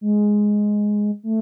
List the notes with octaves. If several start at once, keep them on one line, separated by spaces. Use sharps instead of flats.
G#3
A3